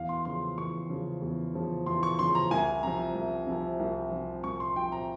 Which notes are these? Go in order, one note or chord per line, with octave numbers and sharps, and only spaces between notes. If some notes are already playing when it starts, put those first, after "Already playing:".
Already playing: E2 F5
C6
C#3 F3 C6
E2 C#6
C#3 F3
E2
C#3 F3
E2 C6
C#6
C#3 F3 C6
A#5
C2 G#5
C3 F3 A#5
C2
C3 F3
C2
C3 F3
C2 C#6
C6
C3 F3 G5
A#5